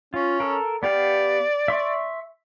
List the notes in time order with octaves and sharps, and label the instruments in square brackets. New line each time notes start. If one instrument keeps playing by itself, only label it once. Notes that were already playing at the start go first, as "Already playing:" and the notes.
[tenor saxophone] C#4 [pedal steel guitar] F4
[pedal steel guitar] A4 A#4
[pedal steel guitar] B3 G4 F5 [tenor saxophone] D5
[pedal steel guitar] E5 C6 C#6